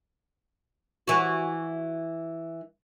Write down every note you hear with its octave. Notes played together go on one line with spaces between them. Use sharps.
E3 F#4